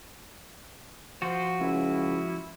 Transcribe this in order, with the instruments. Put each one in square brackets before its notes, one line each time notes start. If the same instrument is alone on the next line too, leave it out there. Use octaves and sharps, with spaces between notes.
[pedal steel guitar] F3 F#4 [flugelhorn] C5
[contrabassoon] C#2 [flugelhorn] E4